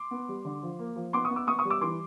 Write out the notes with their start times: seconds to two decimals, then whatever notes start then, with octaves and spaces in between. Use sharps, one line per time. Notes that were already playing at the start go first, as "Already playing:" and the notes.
Already playing: C6 D6
0.11 B3
0.29 G3
0.45 D3
0.63 F3
0.79 A#3
0.96 F3
1.13 B3 C6 D6
1.25 C#6 D#6
1.31 B3
1.36 D6 E6
1.47 B3 C#6 D#6
1.59 C#6 D#6
1.65 G3
1.70 D6 E6
1.81 E3 C6 D6